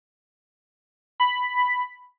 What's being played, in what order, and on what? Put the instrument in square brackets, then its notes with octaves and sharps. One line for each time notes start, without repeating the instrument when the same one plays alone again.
[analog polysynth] B5